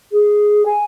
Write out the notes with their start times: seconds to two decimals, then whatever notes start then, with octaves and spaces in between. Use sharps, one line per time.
0.11 G#4
0.65 G#5